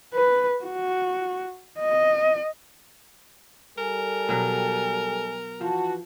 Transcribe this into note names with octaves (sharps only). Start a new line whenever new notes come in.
B4
F#4
D#5
G3 A4 A#4 G#5
B2 F#3
E3 F3 F#4 A5